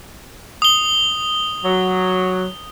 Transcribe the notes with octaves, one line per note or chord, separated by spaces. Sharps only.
D#6 G7
F#3